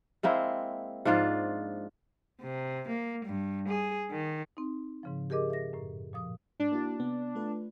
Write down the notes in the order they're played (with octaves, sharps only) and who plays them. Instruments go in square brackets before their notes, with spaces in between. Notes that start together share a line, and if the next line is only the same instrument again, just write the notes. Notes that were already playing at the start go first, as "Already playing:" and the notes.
[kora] G#3 A#3 C4 E4
G#2 F3 D4 F4
[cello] C3
A#3
G2
G#4
D#3
[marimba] C4 D#4
G#2 C#3 F3
G4 G#4 A#4 D#5 D6
E5 A#6
F#2 A2
A#2 F3 D#6
[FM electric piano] G#2 [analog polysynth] D4
[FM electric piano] A#3 E4 F#4
C3 B3
A3 F4 B4